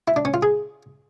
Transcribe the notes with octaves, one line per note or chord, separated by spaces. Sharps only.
E4
D4
C#4
F4
G#4